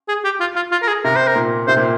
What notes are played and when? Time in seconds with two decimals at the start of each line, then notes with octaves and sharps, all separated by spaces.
0.08 G#4
0.25 G4
0.40 F4
0.56 F4
0.72 F4
0.82 A#4
0.88 G#4
1.04 C3 A#4
1.16 C5
1.27 A#4
1.35 A#2
1.68 C3 C5
1.77 A#2